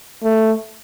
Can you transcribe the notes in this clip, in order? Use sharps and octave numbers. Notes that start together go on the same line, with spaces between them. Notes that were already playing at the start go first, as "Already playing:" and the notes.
A3